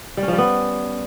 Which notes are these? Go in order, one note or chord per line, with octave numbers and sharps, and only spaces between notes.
G3
C#4
F3
G3
B3